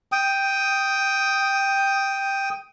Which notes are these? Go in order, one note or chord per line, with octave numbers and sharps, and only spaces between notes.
G5 D#6